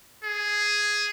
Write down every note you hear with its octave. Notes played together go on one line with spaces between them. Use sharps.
G#4